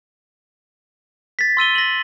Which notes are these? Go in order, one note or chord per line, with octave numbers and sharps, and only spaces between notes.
A6 B6
C6 E6 D#7 G7
A#6 F#7